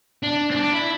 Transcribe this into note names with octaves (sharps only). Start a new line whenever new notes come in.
D4
C4
D4
E4